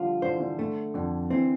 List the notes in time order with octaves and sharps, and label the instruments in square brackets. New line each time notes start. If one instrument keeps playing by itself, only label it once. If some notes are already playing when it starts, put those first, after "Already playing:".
Already playing: [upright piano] D3 F3 G3 [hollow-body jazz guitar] F4
[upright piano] D3 [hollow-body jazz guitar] C5
[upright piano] E3
D3
[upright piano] D3 [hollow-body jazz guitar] A3
[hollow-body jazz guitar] F2 [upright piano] D3
[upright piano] E3 [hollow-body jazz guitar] C4